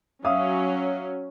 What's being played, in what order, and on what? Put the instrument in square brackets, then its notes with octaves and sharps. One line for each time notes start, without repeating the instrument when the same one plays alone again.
[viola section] F#3 C#4 [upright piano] E5 F5 D#6